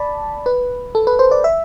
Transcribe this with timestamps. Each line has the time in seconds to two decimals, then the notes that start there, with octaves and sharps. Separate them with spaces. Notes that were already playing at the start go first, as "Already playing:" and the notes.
Already playing: D5 A5 B5
0.46 B4
0.95 A4
1.07 B4
1.19 C5
1.31 D5
1.44 E5